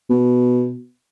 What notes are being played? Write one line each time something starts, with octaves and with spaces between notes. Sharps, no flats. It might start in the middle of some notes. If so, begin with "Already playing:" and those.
B2